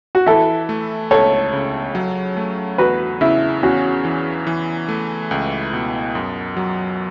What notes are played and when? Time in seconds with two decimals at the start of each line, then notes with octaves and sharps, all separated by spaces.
0.15 F#4
0.26 E3 E4 A4
0.69 A3
1.11 C#2 A4 C#5
1.53 C#3
1.95 F#3
2.37 A3
2.78 E2 F#4 B4
3.21 C#3 E4
3.63 E2 C#4 F#4
4.05 E3
4.47 E3
4.89 A3
5.31 C#2
5.73 B2
6.15 F#2
6.57 F#3